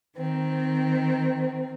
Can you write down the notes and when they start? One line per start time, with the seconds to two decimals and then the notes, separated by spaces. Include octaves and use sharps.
0.16 D#3 C4